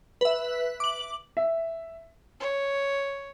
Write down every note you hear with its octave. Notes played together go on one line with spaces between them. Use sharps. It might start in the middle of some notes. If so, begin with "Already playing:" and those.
B4 E5
D6 F#7
E5
C#5